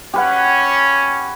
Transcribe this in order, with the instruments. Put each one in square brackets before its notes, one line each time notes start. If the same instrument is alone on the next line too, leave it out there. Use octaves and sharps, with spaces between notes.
[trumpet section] C#4 [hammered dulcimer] G4 B4 F#5